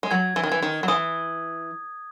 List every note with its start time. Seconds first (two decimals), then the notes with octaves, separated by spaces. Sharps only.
0.03 G#3
0.11 F#3 G#6
0.36 E3
0.43 D#3
0.49 E3 G#6
0.62 D#3
0.83 F#3
0.88 E3 D#6